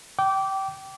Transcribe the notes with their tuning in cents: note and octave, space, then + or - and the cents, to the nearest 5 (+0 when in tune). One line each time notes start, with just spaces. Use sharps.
G5 -20 D6 -15